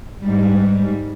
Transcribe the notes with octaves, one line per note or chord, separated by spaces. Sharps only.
G#2 G3